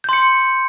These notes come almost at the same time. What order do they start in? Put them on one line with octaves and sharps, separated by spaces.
G6 C6 C#7